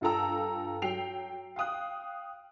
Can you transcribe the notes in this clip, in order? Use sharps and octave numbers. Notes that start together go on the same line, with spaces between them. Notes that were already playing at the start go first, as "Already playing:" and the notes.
G2 F4 A4 G5 A#5 E6
F#3 G5 C7 F7
F5 G5 D#6 F#6